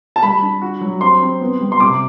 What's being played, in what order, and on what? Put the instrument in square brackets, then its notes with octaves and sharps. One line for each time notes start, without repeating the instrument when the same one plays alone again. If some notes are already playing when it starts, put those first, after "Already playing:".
[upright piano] A5
[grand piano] G3 [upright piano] B5
[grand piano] D4
F#4
F#3
[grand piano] C4 [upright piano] C6
[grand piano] C4
B3
G3
[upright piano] C6
[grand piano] C3 [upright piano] D6